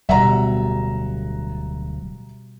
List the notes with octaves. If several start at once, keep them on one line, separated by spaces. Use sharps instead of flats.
D1 B2 G3 E5 F#5 A#5